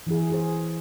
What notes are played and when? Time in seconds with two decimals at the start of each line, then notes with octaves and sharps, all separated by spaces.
0.07 E3 E4 G#4
0.30 F#4 G#4 C5